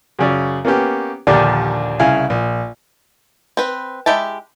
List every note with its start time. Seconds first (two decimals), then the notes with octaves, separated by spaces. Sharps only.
0.19 F#2 C#3 D5
0.65 A#3 B3 C#4 G4
1.27 A#1 D#2 D3 D4 G4 A#4
1.99 C2 C#3 E4 F5 G#5
2.30 A#1
3.57 C4 B4
4.06 G#3 E4 G4 E5 A5